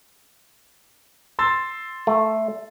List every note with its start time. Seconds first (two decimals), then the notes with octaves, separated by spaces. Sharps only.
1.39 C6 E6 A6
2.07 A3